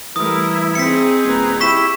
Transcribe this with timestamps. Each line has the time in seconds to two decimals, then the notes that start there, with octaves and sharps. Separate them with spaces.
0.16 E3 G3 A3 E4 A#4 D#6
0.75 C4 D#4 G#4 B6 C#7
1.25 D#1 B4 A#5 G#6
1.60 E4 G4 B5 C#6 B6 E7